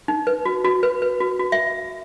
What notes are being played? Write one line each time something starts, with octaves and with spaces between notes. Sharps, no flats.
D#4
B4
F#4
F#4
B4
B4
F#4
F#4
E5